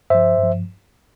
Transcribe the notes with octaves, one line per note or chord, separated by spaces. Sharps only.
G2 F3 C5 E5
G2
F3